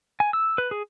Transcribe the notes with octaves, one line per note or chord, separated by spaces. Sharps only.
G#5
E6
B4
G#4